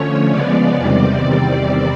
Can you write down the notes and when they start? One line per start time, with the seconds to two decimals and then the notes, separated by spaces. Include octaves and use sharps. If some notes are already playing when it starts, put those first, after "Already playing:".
Already playing: D3 F3 A3 C#4 C#5
0.31 C#3 F3 G#3 B3 D5
0.77 E2 C3 D#3 G3 C4 D5